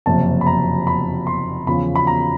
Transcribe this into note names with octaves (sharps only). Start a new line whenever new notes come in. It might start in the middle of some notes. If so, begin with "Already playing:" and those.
F#1 F2 C3 A5
B5
A#5
B5
C6
E2 C#3 F3 B5
B5
A#5